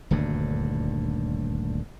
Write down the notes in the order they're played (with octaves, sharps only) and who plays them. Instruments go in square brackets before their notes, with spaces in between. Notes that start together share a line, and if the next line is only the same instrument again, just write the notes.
[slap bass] D#1 D2 G2 D3